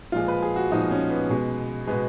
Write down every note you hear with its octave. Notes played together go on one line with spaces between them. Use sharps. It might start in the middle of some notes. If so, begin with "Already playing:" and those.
A#2 F3 G#3 F4
B4
G#4
F#4
A#2 F3 G#3 D#4
C#4
B3
B2 G#3
B2 G#3 B3